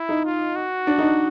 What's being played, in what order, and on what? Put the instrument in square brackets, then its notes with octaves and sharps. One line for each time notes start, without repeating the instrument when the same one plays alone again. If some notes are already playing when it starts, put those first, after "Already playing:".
Already playing: [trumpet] E4
[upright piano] D#4
[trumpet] F4
F#4
[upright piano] D4
D#4
D4